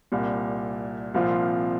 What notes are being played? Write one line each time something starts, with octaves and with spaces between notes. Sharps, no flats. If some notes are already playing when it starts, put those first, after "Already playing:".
C2 A#2 G3
C2 A#2 F3 C4 F4